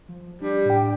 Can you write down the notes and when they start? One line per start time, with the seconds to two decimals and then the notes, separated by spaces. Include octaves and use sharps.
0.09 F3
0.41 G3 D4
0.66 A2 G5